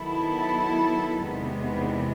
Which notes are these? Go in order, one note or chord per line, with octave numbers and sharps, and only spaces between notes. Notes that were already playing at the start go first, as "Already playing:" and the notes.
Already playing: D#3 F#3 B3 E4 A4
E2 C3 D#3 G#3 B3